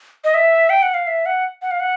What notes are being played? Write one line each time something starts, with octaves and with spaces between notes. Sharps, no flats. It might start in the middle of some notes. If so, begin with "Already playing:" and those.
D#5
E5
G5
F#5
F5
E5
F#5
F#5
F5
F#5